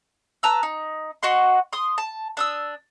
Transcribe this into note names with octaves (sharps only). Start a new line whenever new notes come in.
B4 A5 A#5 E6
D#4
F#4 D#5 F#5 C6
C6 D#6
A5
D4 D#6 E6